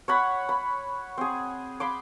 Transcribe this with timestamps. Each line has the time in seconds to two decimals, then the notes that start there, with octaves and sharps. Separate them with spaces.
0.08 C#5 F#5 B5
0.49 B5
1.18 C4 G#4
1.80 B5 C6 D6